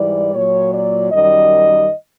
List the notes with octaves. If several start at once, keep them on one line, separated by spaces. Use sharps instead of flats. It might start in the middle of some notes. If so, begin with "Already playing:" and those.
Already playing: G#2 E3 G3 D5
A#2 F#3 C#5
D5
F#2 D#3 G3 D#5